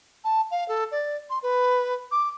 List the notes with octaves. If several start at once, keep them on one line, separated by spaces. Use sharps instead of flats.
A5
F5
A4
D5
C6
B4
D6